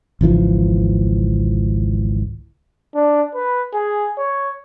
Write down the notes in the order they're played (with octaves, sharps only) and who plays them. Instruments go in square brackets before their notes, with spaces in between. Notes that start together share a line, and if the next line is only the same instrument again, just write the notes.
[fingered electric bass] G#1 C#2 E3 F3
[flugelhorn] D4
B4
G#4
C#5